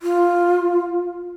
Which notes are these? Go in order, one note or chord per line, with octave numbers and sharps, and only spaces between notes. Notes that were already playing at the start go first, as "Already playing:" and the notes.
F4